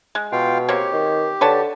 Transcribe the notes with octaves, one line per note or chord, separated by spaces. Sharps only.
G#3
B2 F4 F5 G5
A#3 C4 G4 C#5
D#3
D3 B4 C#5 A5